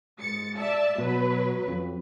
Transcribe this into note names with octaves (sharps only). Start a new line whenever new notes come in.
G#2 A6 C#7
D5 E5 A5
B2 F#3 B4
F2